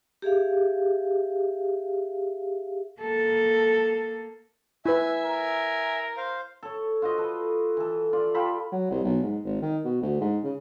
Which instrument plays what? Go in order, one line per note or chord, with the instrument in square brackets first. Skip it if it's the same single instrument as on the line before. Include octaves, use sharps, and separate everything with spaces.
[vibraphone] G4 G#4 E5 F5
[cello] A#3 A4
[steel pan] E4 B4 [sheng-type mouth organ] E5 G#5
[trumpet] A#4
[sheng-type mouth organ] C5 F5
[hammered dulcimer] A4 C#5
F4 F#4 C5 D#5
A4 B4
E3 A4
F4 D5
F4 G4 A4 B5
[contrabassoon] F#3
C2
B1
G#2
G#1
D#3
B2
D2
G#2
C#3